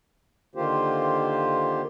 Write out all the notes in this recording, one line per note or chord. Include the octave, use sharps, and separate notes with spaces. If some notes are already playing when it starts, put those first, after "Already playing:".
D3 D#3 A#3 F4 G4 C5